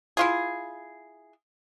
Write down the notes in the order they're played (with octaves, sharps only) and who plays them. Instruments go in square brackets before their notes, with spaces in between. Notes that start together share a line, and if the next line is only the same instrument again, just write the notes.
[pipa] E4 F4 G#4